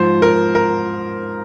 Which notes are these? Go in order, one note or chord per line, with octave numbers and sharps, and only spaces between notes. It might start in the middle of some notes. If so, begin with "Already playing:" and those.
Already playing: G#2 F3 C5
A#4
A#4